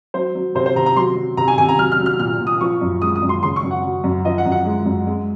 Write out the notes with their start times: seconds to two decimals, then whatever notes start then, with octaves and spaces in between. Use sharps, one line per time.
0.14 F#3 C5
0.35 F#3
0.55 C3 C5
0.66 C5
0.76 C3 A#5
0.86 A#5
0.96 F#3 C6
1.16 F#3
1.37 C3 A#5
1.48 G#5
1.58 C3 G#5
1.69 A#5
1.79 F#3 F6
1.92 F6
1.99 F#3
2.06 F6
2.19 A#2 F6
2.40 A#2
2.47 D#6
2.61 F3 C#6
2.81 F#2
3.02 G#3 D#6
3.16 D#6
3.22 F#2
3.29 C6
3.42 C#3 C6
3.56 C#6
3.63 F#2
3.71 F#5
3.84 F#3
4.04 F#2
4.25 F3 D#5
4.38 F#5
4.45 F#2
4.52 F#5
4.66 G#3
4.86 F#2
5.07 G#3